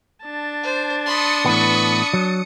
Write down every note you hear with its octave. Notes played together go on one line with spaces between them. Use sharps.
D4 A5
C5
B5 C6 D#6 C#7
A2 E3 B3 B5 C#6
F#3